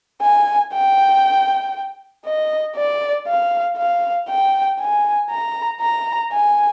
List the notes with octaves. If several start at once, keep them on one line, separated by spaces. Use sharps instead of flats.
G#5
G5
D#5
D5
F5
F5
G5
G#5
A#5
A#5
G#5